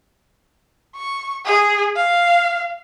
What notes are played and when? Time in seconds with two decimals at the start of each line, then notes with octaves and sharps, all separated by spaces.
0.96 C#6
1.45 G#4
1.96 F5